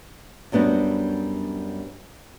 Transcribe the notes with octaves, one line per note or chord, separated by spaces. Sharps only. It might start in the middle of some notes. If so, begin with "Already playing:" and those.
F#2 G3 B3 D4 F#4